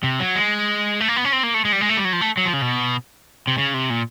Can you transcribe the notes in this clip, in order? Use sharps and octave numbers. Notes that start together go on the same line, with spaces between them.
C3
F#3
G#3
A3
A#3
B3
C#4
C4
A#3
A3
G#3
G3
G#3
A3
G3
F#3
F3
A3
F#3
F3
C#3
B2
C3
C#3
C3
A#2